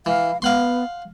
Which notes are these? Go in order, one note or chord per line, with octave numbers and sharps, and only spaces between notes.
E3 F5
B3 F5 F#5 C6